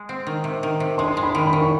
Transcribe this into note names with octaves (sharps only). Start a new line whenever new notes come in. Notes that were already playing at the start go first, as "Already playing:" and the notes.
Already playing: G#3
C4
D#3
C3
D#3
C3
G#3 C6
G#3
B5
D#3
B5
D#3
C#6